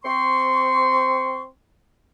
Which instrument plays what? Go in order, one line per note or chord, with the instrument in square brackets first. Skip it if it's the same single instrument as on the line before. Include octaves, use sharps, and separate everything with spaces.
[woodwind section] C4 C6 C#6